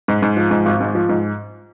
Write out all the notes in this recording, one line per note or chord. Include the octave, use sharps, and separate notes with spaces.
G#2
G#2
F3
G#2
G#1
G#2
F3
G#2